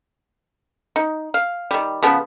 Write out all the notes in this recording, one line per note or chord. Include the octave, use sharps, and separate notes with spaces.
D#4
F5
D#3 G3
C#3 F3 B3